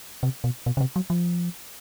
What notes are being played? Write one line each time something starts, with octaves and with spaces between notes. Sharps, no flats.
C3
B2
B2
C#3
C3
F#3
F3